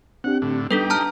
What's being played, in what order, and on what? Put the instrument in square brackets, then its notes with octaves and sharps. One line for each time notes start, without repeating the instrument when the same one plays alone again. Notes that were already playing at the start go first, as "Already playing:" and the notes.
[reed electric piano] C4 D4 G4 [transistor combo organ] F#5
[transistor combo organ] A2 D3
[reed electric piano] G3 B3 [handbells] D4 A4 B4 [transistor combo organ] D#4 G4
[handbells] A5 A#5 F6